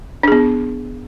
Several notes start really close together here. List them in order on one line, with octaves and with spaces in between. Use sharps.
D4 G#4 B3